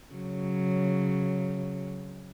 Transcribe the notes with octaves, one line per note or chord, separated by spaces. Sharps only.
C#3 F#3